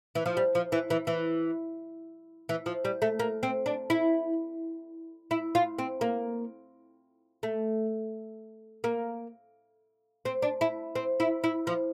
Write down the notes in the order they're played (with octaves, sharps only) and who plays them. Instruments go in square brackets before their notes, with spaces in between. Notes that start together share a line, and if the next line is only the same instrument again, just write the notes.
[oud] E3
F3
G3
F3
E3
E3
E3
E3
F3
G3
A3
A#3
C4
D4
E4
E4
F4
C4
A#3
A3
A#3
C4
D4
E4
C4
E4
E4
F3